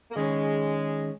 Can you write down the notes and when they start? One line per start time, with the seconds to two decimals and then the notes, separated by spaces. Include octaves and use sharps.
0.11 A#3
0.16 D#3 G#3 C#4 G#4 C#5